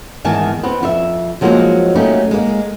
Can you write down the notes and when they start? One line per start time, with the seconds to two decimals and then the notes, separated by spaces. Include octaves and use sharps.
0.25 E2 G#2 D#3 G#5 A5
0.63 B3 C4
0.81 F2 F4 E5
1.41 F3 F#3 G#3 A#3 C4 D#4
1.95 F#3 A3 A#3 C#4 D#4 G4
2.31 G#3 A#3